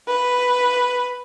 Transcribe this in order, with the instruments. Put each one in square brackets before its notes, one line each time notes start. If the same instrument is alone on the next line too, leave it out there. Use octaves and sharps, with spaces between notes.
[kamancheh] B4